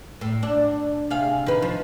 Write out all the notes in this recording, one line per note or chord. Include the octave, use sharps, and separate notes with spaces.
A2
D4
C3 G#4 F5
D#3 B4
F3